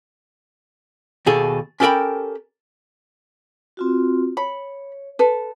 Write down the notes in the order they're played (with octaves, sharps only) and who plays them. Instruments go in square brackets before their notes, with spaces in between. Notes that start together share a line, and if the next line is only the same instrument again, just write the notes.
[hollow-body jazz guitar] D#2 B2 G#4 A4
C#4 G4 A4 A#4 G5 B5
[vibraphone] C4 F4 F#4
[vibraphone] C#5 [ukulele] B5
[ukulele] A4 B4